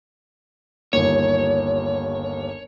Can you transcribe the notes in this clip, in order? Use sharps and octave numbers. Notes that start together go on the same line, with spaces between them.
G1 D#2 C#5